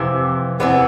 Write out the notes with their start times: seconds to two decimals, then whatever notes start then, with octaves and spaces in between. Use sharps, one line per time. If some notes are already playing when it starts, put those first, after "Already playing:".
Already playing: F2 C3 E3
0.60 E2 C3 E3 B3